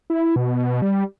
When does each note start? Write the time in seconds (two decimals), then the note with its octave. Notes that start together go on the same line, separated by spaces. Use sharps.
0.10 E4
0.36 B2
0.82 G3